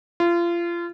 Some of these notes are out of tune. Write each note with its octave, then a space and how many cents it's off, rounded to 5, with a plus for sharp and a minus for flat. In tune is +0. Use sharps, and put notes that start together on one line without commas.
F4 -30